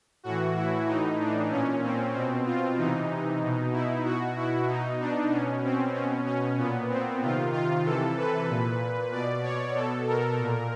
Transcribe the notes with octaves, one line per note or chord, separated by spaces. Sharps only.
A2 E3 F#4
E4
A2 E3 D#4
D4
A#2 C#4
C4
B2 C4
F4
C3 E3 D#4
B2
E4
B2 F#4
E4
B2 D#4
D4
B2 C#4
C4
B2 C#4
C#4
A#2 B3
C4
C3 D#3 F4
F4
C3 E3 A4
B4
A#2
B2 D5
C#5
B2 A4
A#4
A#2